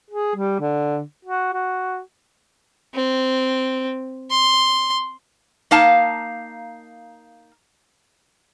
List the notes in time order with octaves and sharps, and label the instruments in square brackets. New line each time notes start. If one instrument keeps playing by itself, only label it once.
[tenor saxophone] G#4
G3
D3
F#4
F#4
[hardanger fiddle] C4
C6
[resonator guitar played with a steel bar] A#3 D#4 F5 A5